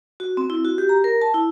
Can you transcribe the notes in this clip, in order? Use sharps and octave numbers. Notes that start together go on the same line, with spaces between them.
F#4
C4
E4
F#4
G4
A#5
A#4
A5
E4